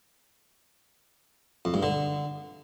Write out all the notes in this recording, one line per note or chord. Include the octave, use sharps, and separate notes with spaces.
F2
G2
D3